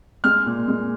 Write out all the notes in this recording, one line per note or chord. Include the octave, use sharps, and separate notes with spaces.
G#3 F6
A#2
G#3